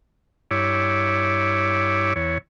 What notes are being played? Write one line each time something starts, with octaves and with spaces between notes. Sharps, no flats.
G2 E4 C#5 D6
E2 C#5